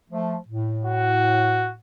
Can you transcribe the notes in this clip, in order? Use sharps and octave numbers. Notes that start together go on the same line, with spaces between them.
F3 A3
A2
F#4